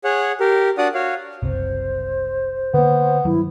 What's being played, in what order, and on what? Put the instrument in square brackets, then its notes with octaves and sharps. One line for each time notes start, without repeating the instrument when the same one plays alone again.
[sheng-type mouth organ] G#4 C#5 F#5
G4 A#4
D4 F#4 D5 F#5 D#6
F#4 C#5 F5
[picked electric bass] F#1 C2 C3 [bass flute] C5
[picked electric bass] D3 A#3 [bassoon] B3
[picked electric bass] G2 D#3 F#3 [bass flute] E4